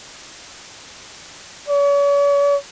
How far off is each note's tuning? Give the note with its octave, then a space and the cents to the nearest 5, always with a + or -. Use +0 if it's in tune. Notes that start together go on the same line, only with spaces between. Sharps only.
C#5 +40